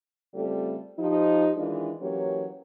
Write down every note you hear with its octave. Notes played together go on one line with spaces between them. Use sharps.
C#3 G3 A3 C4 F4 A4
F3 D#4 G4
D#3 E3 G#3 D4 D#4 F4
E3 F#3 A#3 C#4 G4 C#5